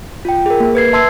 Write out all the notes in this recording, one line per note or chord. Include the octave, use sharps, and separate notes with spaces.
F4 G5
G#4 A#4
A#3
B4 G#6 C7
E5 A5 C6 E6 G#6 C7